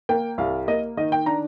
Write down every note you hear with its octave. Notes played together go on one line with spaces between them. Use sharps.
A#3 G5
C2 F5
A#3 D#5
D#3 D#5
G5
D4 A#5